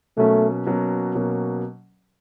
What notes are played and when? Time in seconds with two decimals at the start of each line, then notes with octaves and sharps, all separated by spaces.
0.17 B2 F#3 A3 A#3 C#4
0.66 B2 F#3 A#3 C#4
1.15 B2 F#3 A#3 C#4